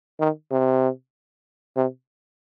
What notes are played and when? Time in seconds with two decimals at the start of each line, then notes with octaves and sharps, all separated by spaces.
0.20 D#3
0.51 C3
1.76 C3